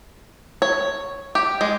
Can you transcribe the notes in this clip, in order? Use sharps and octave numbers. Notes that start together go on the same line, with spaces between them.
C#5
G4
G#3